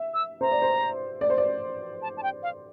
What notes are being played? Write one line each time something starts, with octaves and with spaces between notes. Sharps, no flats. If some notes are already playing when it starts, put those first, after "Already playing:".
Already playing: E5
E6
C5 A#5
D5
C5
D5
C5
D5
A5
A5
G5
F5